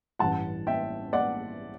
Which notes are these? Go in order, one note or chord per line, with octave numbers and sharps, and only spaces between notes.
A1 G2 E3 F#5 A5
E5 G5
D5 F#5